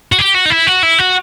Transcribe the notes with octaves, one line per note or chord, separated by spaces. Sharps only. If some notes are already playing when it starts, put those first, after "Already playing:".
F#4
G4
F#4
D#4
E4
F#4
E4
F#4